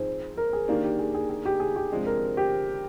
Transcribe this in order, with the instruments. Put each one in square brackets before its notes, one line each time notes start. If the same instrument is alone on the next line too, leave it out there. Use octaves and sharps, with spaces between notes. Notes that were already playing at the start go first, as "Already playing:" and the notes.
Already playing: [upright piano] G#2 F3 C4 D#4 [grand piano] G#4
[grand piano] A#4
G#4
[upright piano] D#3 A#3 D4 [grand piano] G4
[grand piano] G4
G#4
G#4
G#4
G4
G#4
G4
[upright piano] C3 F3 G#3 D4 G4
[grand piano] A#4
G4